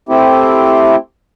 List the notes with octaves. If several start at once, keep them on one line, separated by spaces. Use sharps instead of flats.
A3 C4 E4 G4